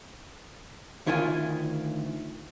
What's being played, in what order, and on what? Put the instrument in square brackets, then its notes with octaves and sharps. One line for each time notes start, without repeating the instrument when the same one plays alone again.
[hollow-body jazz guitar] D2 D#3 E4 F4 G#5